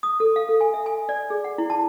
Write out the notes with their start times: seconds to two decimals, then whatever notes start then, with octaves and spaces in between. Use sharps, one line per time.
0.03 D#6
0.20 A4
0.36 F5
0.49 A4
0.61 G#5
0.74 E5
0.86 G#5
1.09 D5
1.30 G#4
1.44 F#5
1.58 E4
1.70 A5